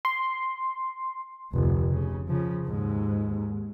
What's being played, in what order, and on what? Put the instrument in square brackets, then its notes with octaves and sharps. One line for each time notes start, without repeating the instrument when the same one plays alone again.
[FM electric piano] C6
[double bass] F1 D2
C#3
C#3 F3
D#2 G#2